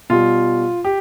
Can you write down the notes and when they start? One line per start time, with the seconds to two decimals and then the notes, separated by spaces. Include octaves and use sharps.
0.10 B2 G3 F4
0.85 G4